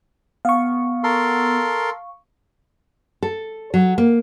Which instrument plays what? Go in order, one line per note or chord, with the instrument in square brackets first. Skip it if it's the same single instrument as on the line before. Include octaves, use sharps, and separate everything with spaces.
[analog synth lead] B3 [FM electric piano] F5 C#6
[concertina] A4 A#4 C6
[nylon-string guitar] A4
F#3
A#3